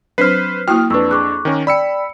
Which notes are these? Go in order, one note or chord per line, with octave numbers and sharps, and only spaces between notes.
F#3 C4 D4 B4 C5 F6 B6 C7
A#3 E4 F#4 G5 D#6 F6
F2 D4 B4 C#6 E6
G#4 C#6 D6 F#6
D#3 C#4 A#4
D5 G5 B5 E6 C#7